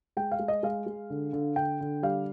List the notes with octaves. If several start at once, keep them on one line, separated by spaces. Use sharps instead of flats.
G#3 G5
F5
G#3
D#5
G#3 F5
G#3
D3
D3
D3 G5
D3
G3 F5